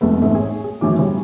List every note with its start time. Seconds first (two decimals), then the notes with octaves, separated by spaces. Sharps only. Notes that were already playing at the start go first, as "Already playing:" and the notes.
0.01 F1 G#3 A3 B3
0.22 A1 G#2 G#3 A3 E5
0.35 G#4 C#5
0.64 G#4
0.81 F#2 A2 D#3 E3 D6
0.99 C#3 G3 C#5